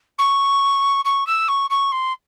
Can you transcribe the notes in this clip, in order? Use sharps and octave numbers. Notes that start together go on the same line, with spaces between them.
C#6
C#6
E6
C#6
C#6
C6